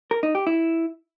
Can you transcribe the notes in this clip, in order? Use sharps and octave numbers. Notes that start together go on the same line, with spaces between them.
A#4
D#4
G4
E4